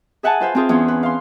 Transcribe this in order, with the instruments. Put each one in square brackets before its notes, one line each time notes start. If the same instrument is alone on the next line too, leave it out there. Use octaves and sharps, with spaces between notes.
[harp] G#4 E5 F#5 G#5 A5
F4 B4 C5 E5 F5
C4 F4 G#4 C5
E2 C#4 C6
B4
F5 C6